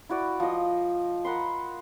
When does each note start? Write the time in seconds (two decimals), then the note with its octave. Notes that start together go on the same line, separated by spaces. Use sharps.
0.09 E4 F#4 D5
0.40 F3 D#5
1.25 A#4 F#5 B5 C6